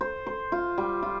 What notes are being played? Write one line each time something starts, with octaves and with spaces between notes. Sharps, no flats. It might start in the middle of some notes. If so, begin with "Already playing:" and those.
C5
C5
F4
G3
F4